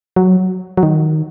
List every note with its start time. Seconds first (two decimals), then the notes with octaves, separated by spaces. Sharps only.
0.16 F#3
0.77 F#3
0.83 D#3